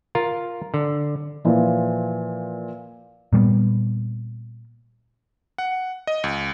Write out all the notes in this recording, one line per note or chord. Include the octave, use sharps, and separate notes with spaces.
F4 A#4
D3
A#2 E3 F3
A#2 G3 A3 B3
F#5
D#5
C#2